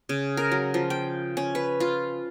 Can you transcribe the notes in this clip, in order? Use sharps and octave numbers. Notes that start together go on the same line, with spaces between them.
C#3
A#4
F#3
F3
G5
C#4
B4
F4